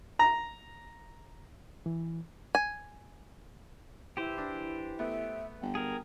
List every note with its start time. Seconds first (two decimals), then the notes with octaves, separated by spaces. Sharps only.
0.19 A#5
1.86 E3
2.55 G#5
4.17 E3 E4 G4 C5
4.38 D4
4.99 A3 B3 E5
5.62 G1 G5
5.75 G#4 A#4